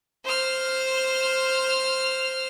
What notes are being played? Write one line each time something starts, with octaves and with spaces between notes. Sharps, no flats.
C5 F6